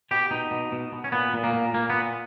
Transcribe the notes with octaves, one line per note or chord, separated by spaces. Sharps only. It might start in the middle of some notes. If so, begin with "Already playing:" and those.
B2 G4
B2 D#4
B2
B2
B2
C#4
A#2 B3
A#2
A#3
A#2
A#2 A#3
A#2 B3